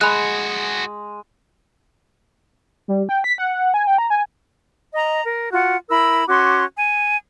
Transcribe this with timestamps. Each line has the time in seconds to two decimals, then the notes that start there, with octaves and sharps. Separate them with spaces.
0.01 G#3 F#4 G#4 B5 F#6
2.88 G3
3.09 G5
3.24 B6
3.38 F#5
3.74 G#5
3.87 G5
3.98 A#5
4.10 G#5
4.93 D#5 A#5
5.25 A#4
5.52 F4 F#4 F#5
5.89 E4 A#4 B5 E6
6.27 C#4 F#4 C6 D6
6.74 G#5